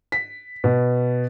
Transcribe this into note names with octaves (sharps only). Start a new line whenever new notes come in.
B6
B2